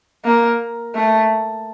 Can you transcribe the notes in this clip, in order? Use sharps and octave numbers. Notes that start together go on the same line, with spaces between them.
A#3
A3